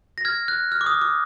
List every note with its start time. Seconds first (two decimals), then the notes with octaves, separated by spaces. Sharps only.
0.18 A#6
0.25 F6 G#6
0.48 F#6
0.72 F6
0.81 D6
0.86 D#6
1.01 D6